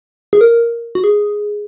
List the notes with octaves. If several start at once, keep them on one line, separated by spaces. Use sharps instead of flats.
G#4
A#4
F#4
G#4